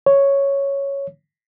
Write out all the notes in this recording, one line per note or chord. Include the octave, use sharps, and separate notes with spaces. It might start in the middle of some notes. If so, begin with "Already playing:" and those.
C#5